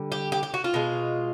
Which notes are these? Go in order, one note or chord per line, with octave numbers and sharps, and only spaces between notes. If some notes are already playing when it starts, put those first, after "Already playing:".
Already playing: D3 G3
G4
G4
G4
F#4
F4
B2 G#3